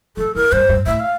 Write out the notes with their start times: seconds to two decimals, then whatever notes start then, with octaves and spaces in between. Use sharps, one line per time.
0.17 F3 A4
0.35 E3 A#4
0.52 G2 C5
0.69 G2
0.86 A2 E5
1.00 F5